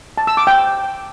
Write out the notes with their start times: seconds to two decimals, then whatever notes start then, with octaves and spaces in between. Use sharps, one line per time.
0.18 A5
0.27 E6
0.37 D6
0.47 G5